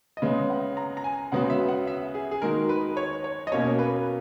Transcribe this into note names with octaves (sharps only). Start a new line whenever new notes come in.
D#5
C#3 G#3 B3 E5
F#5
A#5
A#5
G#5
C#3 G#3 B3 F#4 F#5
E5
F#5
E5
G#4
G#4
D#3 G#3 D#4 F#4 A#4
B4
C#5
C#5
D#5
B2 A#3 C#4 C#5
B4